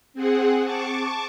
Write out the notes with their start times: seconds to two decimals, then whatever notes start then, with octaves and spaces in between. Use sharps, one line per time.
0.14 C4 G#4 F#5
0.65 A5 C#6 D6